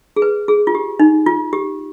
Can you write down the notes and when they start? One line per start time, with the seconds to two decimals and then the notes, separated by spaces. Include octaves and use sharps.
0.16 G#4
0.22 B4
0.48 G#4
0.67 F4
0.75 G4
1.00 D#4
1.26 F4
1.53 G4